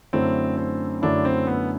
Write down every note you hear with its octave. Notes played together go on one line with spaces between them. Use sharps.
F#2 D3 A3 C4 E4
C4
F#2 D3 A3 D4 E4
C4
B3